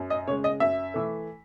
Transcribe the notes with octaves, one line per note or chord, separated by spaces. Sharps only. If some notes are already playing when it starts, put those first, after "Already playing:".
Already playing: F#2
D#5
C#3 G#3 C#5
D#5
F#2 E5
E3 A3